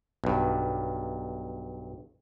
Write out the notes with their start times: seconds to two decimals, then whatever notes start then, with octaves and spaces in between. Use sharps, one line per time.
0.24 B1 G2